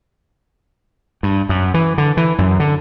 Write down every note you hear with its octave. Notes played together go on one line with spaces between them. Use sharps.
G2
F#2
E3
D3
E3
F#2
D3